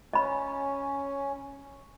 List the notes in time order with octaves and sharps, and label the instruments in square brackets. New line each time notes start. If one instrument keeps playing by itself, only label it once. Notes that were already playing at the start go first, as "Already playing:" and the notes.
[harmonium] C#4 [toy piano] D#5 B5